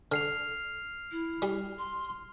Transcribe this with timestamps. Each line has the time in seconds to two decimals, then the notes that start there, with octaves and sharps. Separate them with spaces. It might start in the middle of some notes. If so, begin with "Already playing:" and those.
0.12 D3 F6 C7 F7
1.12 E4
1.42 G3
1.78 C6